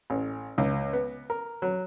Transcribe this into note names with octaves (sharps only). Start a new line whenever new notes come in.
A1
C#2
B3
A#4
F#3